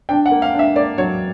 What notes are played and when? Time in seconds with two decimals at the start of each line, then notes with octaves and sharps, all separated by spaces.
0.09 D4 G5
0.26 F#5
0.31 A#3
0.42 F5
0.53 D4
0.59 E5
0.76 A#3 D5
0.98 F#3 C#5